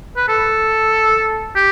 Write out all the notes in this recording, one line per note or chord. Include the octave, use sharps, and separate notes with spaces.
B4
A4
G4